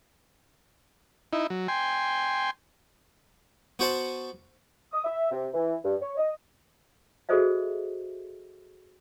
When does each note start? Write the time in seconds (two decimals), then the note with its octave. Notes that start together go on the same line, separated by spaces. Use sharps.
1.33 D#4 E4
1.50 F#3
1.68 G5 G#5 C6
3.79 B3 F#4 C5 F#5 A5
4.93 D#6
5.04 E5
5.31 C3
5.53 E3
5.83 G2
6.01 C#5
6.17 D#5
7.29 F#4 G#4 A4 C5 D#5 E5